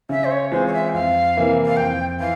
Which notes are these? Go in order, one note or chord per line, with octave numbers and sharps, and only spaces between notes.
C#3 E5
C5
C#5
E3 G#3 C4 F4 C5
C#5
E5
G5
F2 F5
C3 E3 A#3 E4
F5
F2 G5
E3 E4 F5